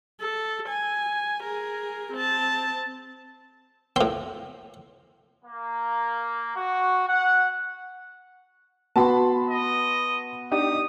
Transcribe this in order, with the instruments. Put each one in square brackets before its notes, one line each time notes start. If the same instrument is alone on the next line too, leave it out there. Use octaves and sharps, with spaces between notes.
[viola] A4
G#5
G#4 A#4
C4 A5
[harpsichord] A2 C4
[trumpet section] A#3
F#4
F#5
[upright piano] B3 F#4 [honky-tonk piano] A5 B5 C6
[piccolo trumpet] D#5
[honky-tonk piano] D4 D#4 G4 [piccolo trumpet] D#6